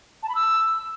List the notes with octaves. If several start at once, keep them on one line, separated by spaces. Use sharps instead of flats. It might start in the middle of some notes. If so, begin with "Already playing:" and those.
A5
B5
E6